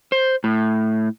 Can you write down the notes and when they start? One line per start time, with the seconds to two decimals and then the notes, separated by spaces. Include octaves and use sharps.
0.12 C5
0.44 A2